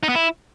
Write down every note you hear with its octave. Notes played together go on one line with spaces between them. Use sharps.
D#4
B3
E4